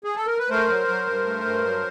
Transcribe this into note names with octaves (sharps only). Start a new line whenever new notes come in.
G#4
A4
A#4
B4
A3 A#4 C5
F#3
F#3
G2
A3
G2
F#3